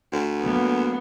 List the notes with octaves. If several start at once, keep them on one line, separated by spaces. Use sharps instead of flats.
D2
F#3 A#3 B3